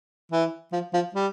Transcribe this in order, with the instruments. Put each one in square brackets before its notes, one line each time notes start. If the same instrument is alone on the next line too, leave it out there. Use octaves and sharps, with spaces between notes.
[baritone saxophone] E3
F3
F3
G3